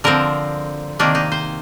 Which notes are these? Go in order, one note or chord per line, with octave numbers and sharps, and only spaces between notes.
D3 F3 C4 A#4
C3 D#3 A#3 D4
D#4
C5